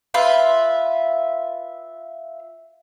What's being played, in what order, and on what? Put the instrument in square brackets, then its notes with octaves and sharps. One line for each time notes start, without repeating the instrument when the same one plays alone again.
[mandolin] F4 B4 E5